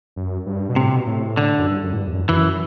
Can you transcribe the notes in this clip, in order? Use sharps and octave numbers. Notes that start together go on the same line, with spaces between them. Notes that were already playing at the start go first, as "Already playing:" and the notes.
F#2
G2
B2
A2 C3
B2
A2
D3
F#2
G2
F#2
A2
G2
E2
F#2
F#2 E3